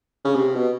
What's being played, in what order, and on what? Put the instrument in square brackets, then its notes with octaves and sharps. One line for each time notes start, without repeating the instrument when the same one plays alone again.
[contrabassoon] C#3
C3
B2